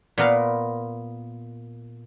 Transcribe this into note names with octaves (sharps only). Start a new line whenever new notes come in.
A#2 B3 A#4 F5